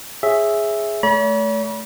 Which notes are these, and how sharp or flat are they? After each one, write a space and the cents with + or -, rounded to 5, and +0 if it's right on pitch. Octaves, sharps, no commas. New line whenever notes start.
G#4 +0 C#5 -10 E5 +0
A3 -20 C#5 +45 B5 -40